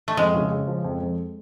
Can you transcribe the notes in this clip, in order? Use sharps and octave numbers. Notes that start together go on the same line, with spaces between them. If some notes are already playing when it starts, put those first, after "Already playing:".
A3
F2 G#3
C#3
C#3
F3
F2
F2